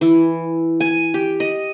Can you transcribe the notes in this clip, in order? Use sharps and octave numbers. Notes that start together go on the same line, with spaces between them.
E3
G#5
G4
D#5